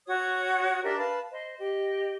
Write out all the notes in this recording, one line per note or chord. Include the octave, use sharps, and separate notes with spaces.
F#4 C#5 D#6 G#6
D4 G4 A#4 E5
B4 F5 A5
C5 D#5
G4 D#5